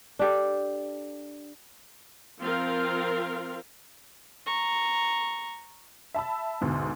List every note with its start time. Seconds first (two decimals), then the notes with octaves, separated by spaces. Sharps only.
0.19 D4 G4 A4
2.41 F3 C4 F4 A#4 F5
4.46 A#5 C#6
6.14 E5 A5 B5 E6
6.61 D2 G#2 B2